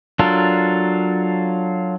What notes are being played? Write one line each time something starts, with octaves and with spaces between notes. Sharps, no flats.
F#3 D4 F4 A4 A#4